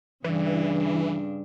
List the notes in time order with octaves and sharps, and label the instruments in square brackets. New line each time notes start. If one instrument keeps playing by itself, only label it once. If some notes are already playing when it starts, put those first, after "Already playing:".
[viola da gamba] G2 C#3 D4 [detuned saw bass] E3